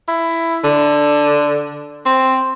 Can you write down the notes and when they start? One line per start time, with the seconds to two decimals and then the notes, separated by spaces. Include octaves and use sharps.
0.09 E4
0.64 D3
2.06 C4